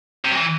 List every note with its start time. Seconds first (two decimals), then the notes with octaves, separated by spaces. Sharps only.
0.25 C3
0.31 F#3
0.36 E3